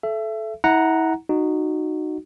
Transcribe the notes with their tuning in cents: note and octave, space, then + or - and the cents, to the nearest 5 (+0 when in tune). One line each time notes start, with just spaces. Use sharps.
A4 -20 E5 +25
E4 -35 F#5 +0 A#5 +0
D#4 -15 F#4 +0